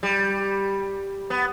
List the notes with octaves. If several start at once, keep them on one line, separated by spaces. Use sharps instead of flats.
G3
B3